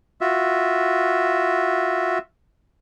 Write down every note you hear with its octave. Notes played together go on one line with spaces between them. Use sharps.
F4 F#4 E5